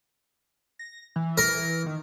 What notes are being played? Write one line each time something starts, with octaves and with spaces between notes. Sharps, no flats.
A#6
E3
A#4
D#3